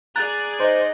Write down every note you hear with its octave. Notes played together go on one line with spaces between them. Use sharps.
G#4 D5 A#5 F#6 A6
D#4 C5